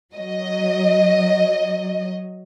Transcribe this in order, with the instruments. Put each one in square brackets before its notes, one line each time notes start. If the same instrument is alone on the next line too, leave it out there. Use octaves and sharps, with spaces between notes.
[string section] F#3 D#5